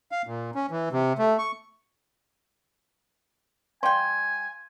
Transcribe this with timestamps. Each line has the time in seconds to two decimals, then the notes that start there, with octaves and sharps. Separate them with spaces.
0.12 F5
0.27 A#2
0.55 C#4
0.71 E3
0.92 C3
1.18 A3
1.39 C#6
3.83 G3 F5 G5 G#5 C6